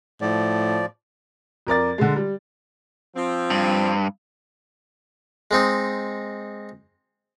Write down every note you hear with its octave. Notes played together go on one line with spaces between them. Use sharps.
A2 F3 D5
F2 A#4 D5 A6
D3 G#3
G3
F3 C4
G2
G#3 C4 D#4